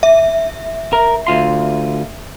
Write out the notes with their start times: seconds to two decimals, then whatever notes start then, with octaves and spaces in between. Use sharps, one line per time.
0.03 E5
0.93 A#4
1.27 D2 F4 C6